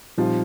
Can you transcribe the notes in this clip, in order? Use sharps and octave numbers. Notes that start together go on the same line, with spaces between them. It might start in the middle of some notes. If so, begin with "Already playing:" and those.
A#2 F3 G3 C4 D#4 G4